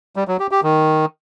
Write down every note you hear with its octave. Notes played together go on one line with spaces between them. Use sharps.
G3
F#3
G4
G4
D#3